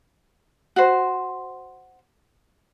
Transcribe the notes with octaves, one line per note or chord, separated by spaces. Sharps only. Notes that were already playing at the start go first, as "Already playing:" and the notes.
F#4 C5